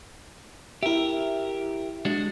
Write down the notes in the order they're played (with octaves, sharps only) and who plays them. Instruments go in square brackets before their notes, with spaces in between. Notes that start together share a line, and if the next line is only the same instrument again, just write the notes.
[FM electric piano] E4 E5 [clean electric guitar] G4 A#4
[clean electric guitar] G#3 D4 F#4